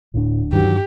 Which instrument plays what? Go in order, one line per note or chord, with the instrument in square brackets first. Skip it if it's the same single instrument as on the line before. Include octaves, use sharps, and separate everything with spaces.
[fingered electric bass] D1 D2 D4 [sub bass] A2
[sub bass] G2 [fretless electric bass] D#3 E3 F#3 [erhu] G4